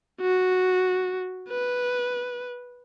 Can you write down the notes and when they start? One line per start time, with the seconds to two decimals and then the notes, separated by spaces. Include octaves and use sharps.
0.21 F#4
1.49 B4